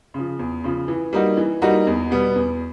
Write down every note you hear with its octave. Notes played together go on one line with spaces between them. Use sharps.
C#3 F3
E2
C#3 F3
E3
G3 A#3 D#4 F#4
E3
G3 A#3 D#4 F#4
E2
B2 G3 B3
E2